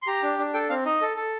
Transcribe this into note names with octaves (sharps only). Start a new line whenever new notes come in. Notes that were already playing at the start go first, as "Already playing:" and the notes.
C6
G4 A#5
D4
D4
A4 G5
C4 F5
D#4 D#5
A4
A4